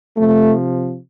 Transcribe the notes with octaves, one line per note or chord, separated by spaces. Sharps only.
C3 F3 A3